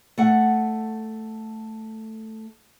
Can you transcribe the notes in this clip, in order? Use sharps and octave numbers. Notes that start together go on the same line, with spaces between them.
A3 F#5